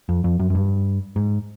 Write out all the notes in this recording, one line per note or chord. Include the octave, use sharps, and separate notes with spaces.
F2
F2
F#2
F#2
G2
G#2